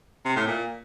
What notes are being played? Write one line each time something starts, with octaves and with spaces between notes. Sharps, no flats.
C3
A2
A#2